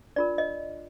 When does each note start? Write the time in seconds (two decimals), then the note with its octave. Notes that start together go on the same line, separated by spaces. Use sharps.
0.16 D4 F4 A#4 D5
0.38 D#5